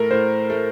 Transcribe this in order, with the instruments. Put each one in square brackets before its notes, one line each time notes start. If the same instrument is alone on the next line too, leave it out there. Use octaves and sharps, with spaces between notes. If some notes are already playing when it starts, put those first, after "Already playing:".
Already playing: [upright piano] A2 A3 [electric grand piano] A#4
[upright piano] A2 [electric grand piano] C5
[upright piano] A3